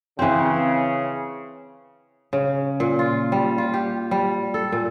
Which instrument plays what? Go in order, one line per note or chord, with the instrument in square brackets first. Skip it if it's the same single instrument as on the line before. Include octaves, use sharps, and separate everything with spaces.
[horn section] C#3 [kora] E3 C4
[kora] C#3
A#2
F4
G3
F4
G4
G3
A4
A#2